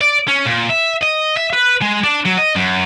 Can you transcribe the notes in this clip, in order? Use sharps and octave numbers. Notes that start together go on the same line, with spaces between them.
D5
C#4
A#2
E5
D#5
E5
B4
G#3
D4
F#3
D#5
F#2